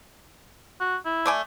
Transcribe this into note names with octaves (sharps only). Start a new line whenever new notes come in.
F#4
E4
A3 D5 G#5